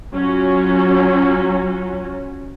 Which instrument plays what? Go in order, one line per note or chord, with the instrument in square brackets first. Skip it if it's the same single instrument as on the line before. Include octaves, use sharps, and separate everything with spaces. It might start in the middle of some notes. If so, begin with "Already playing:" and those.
[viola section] F#3 C#4 F4 F#4